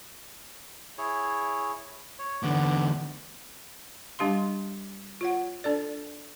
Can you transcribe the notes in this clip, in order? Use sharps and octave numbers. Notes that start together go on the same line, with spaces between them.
E4 G#4 C#5
C#5
E2 D3 B3 D6
G3 D4 G4 F5 C6
F4 C#5 F#5
D4 A4 D5